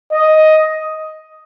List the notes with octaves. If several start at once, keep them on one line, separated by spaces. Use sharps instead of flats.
D#5